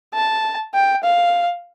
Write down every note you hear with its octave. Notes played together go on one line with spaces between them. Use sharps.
A5
G5
F5